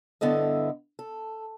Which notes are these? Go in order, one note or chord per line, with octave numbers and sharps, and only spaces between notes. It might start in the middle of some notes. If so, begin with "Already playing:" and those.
G2 D3 B3 E4 A4 D#5
A4